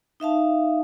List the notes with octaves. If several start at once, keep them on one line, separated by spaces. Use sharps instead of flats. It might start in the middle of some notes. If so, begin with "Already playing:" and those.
D#4 E5 F5 A5